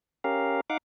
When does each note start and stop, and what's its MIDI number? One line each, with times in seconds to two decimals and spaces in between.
0.24 0.61 61
0.24 0.61 67
0.24 0.61 70
0.24 0.61 77
0.70 0.77 63
0.70 0.77 77
0.70 0.77 78
0.70 0.77 86